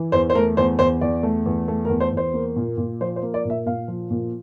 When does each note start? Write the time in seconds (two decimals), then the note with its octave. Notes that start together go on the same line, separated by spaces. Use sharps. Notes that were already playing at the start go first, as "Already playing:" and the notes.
Already playing: E3
0.12 E2 C5
0.30 C5
0.34 A3 A#4
0.57 E2 C5
0.79 E2 C5
1.01 E2 D5
1.23 A3
1.46 E2
1.68 A3
1.85 A#4
1.89 E2
2.00 C5
2.12 E2
2.17 C5
2.34 A#3
2.56 A#2
2.78 A#2
3.01 F3 C5
3.16 C5
3.22 A#3
3.34 D5
3.45 A#2 E5
3.66 A#2 F5
3.88 F3
4.11 A#2